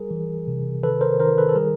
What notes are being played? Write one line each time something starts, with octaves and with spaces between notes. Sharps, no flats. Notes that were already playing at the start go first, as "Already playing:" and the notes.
Already playing: G3 G#4 A#4
E3
C3
D#3 A4 B4
A#4 C5
D#3 A#4 C5
A4 B4
A4
G3 G#4 A#4